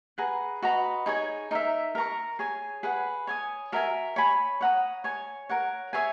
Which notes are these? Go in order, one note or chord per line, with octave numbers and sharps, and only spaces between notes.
G#4 B4 F#5 A#5
F#4 B4 D#5 A#5
D#4 G#4 C#5 G#5
D#4 A#4 E5
A#4 E5 A#5 C#6
G#4 C#5 G#5
G#4 B4 F#5
C#5 G#5 D#6
F#4 A#4 E5 G#5
C#5 G#5 B5
C#5 F#5 A#5 D#6
C#5 G#5 C#6
A#4 C#5 F#5
G#4 C#5 E5 G#5